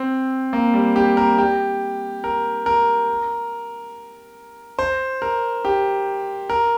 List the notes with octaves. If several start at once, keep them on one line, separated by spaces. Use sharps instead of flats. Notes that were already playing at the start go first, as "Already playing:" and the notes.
Already playing: C4
A#3
G3
G4
A#4
G4
A#4
A#4
C5
A#4
G4
A#4